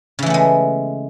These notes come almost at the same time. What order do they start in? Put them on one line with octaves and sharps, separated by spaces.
C#3 E3 A3 B3 G#3